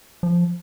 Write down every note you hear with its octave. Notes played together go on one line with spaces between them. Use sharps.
F3